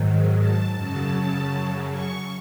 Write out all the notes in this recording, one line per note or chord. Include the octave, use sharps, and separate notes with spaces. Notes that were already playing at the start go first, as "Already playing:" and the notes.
Already playing: G#2 D#3 F#3
A5
F#2 C#3 F#3 A5
C#6